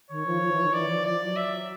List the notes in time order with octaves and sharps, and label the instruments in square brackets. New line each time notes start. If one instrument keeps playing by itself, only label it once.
[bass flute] D#3 [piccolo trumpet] C#5
[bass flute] F3
F3
E3
D#3
[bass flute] E3 [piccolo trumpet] D5
[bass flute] F3
[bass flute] F3 [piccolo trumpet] D5
[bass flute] F#3
[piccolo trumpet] E5